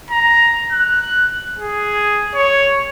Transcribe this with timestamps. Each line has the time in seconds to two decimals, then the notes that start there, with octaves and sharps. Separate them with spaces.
0.11 A#5
0.72 F#6
1.59 G#4
2.35 C#5